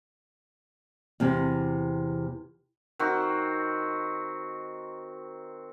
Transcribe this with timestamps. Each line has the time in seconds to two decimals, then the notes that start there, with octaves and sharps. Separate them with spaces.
1.20 E2 C3
2.99 D#3 C4 F#4